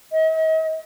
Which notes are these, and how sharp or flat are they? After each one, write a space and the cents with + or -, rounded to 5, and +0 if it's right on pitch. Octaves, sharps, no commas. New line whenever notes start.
D#5 +45